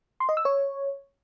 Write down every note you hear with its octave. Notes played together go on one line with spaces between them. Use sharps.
C6
D#5
E6
C#5